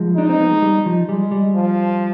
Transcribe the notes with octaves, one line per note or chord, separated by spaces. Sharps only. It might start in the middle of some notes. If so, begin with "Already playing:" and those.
Already playing: F3 G#3
D4 D#4
C4
B3
G#3
G3
F3
G3 G#3
G3
F3